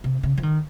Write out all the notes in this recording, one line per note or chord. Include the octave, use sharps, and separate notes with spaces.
C3
C#3
F3
D#3